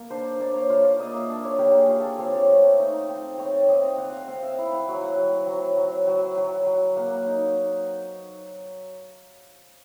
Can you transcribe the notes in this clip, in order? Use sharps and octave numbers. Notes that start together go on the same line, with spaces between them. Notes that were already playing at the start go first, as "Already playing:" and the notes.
Already playing: A#3
D4 C5
A#3 D5
C#5
F4 D5
D5
A#3 D#5
E5
D4 D5
C#5
A#3 G4
G#4
F4
A4
C4 C#5
D5
C#5
A3
D#4
C4
C4 C#5
D5
C4 D#5
F5
C4 F#5
F5
C4 F5
E5
E4 F5
F#5
F#3 F5
F#5
F#3
F#3
F#3
F#3
F#3
F#3
A#3 F#5
D#4